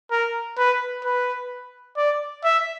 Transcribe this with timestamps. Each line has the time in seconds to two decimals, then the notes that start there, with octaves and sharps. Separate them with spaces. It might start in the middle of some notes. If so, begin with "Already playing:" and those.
0.11 A#4
0.58 B4
1.05 B4
1.97 D5
2.44 E5